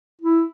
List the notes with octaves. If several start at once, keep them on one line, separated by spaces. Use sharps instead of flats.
E4